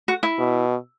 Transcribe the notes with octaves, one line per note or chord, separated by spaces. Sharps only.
F#4
E4
B2